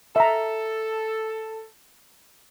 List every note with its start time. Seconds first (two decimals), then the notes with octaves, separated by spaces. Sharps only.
0.16 A4 E5 A#5